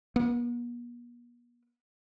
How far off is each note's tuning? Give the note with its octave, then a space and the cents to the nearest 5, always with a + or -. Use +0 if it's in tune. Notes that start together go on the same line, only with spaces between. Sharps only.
B3 -45